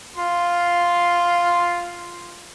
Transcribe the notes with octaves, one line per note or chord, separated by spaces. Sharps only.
F4 C6